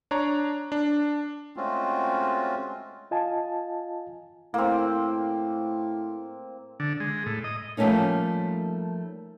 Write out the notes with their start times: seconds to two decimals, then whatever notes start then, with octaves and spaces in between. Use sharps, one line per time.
0.11 D4 C#5 A#5
0.72 D4
1.57 G#3 A3 C4 C#4 F4 F#4
3.11 F4 D#5 F5 G#5 A5
4.54 A2 A#3 C4
6.80 D3
7.00 G#3
7.26 A2
7.44 D#5
7.77 F3 G3 A3 A#3 C#4 D#4